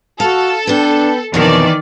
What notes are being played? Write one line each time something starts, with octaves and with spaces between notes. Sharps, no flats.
F#4 A4 F5
B3 D4 G5
F2 B2 D#3 E3 C#5 D5